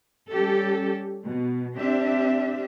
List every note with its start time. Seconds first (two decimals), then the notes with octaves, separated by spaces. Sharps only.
0.33 G3 C#4 G4 A4
1.26 B2
1.76 C4 D4 G4 E5